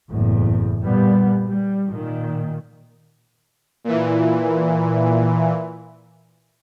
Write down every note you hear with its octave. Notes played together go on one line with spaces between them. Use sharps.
F#1 E2 A2
A#2 G3 B3
G3
A#2 D#3
A#2 E3